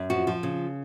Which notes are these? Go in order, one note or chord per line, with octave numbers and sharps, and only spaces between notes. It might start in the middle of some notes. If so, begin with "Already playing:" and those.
Already playing: F#2
F3 F#4
F3
C#3